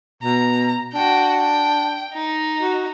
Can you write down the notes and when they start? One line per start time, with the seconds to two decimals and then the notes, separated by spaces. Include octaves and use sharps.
0.23 B2 A#5
0.94 D4 F#4 G5
1.41 G5
2.13 D#4
2.61 F#4